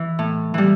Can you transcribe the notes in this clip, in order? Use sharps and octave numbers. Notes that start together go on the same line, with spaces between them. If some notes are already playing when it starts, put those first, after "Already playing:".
Already playing: E3
A2
E3 G3